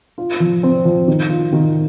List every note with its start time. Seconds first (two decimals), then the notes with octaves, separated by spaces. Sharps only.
0.18 F4
0.40 F3
0.63 C4
0.85 F3
1.08 D#3
1.30 F4
1.53 D#3